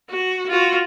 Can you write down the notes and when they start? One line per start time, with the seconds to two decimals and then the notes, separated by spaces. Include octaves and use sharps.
0.10 F#4
0.49 F4 F#4